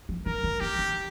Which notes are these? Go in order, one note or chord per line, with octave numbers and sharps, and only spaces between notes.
F3
D#3 A#4
D#3
D#3 G4
D#3